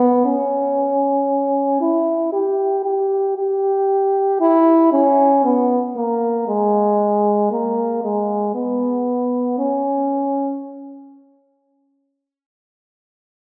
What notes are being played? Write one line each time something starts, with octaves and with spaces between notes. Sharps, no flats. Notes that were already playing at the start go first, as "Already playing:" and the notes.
Already playing: B3
C#4
E4
G4
G4
G4
E4
C#4
B3
A#3
G#3
A#3
G#3
B3
C#4